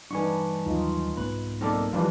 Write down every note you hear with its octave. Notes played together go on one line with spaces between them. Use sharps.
E2 G2 D4 D#4 B4 G#5 C#6
D#2 F#3 D#4 F4
C2 G#2 B3 B4
B1 A#3 C4 D#4 A4 D5
F2 E3 F3 G3 D4 F4 B4